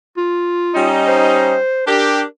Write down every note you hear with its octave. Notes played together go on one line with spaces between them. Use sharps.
F4
G3 C#4 D#4
C5
D4 G4 A#4